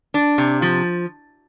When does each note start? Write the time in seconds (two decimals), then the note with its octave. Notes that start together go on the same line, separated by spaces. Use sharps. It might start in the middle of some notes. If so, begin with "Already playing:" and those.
0.14 D4
0.38 C3
0.62 F3